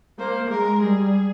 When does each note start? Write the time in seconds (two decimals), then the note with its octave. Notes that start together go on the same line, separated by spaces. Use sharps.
0.19 A#3 C5
0.50 G#3 A#4
0.81 G3 G#4